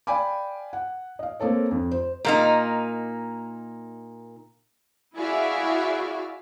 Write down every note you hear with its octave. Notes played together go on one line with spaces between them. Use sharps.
D5 F5 G5 G#5 B5 D6
F#5
D#5 F5
A#3 C4 A4 C#5
F2
C5
A#2 A#3 D#4
E4 F#4 G#4 D5 E5 F5